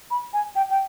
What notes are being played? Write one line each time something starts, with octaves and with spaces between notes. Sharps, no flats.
B5
G#5
G5
G5